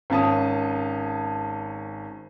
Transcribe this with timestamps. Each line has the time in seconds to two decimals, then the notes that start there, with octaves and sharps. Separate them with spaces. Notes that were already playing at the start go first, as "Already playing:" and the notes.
0.10 G#1 C#4 A5 D#6